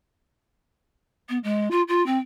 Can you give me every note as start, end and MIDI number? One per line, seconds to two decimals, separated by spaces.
1.29 1.38 59
1.43 1.68 56
1.71 1.82 65
1.88 2.04 65
2.06 2.17 60